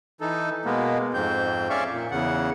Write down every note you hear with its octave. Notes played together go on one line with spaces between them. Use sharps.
E3 D#4 A4
B2 G#3 A#3 B3
F2 G#2 C4 G6
C#4 D5 E5 F5 C#6
A#2
E2 C#3 F#5